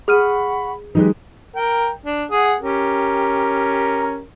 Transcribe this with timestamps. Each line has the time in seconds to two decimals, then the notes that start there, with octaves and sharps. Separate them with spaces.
0.08 G#4 F#5 B5 C#6 F6 D#7
0.95 E3 F#3 G#3 D#4 G4 B4
1.56 A#4 G5
2.06 D4
2.31 G#4 F#5 D#6
2.61 C#4 G4 A#4